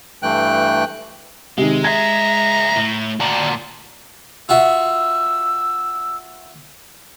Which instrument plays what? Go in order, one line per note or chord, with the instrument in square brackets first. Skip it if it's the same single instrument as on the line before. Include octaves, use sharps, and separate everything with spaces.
[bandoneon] G2 E3 A3 G5 F#6
[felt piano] C3 D#3 [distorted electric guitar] G#3
[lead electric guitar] C#2 E5 [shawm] A#5 [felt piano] G#6
[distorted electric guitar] A2
[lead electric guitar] D2 A#2 [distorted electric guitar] F#4 D5
[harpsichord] F4 F#4 E5 [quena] E6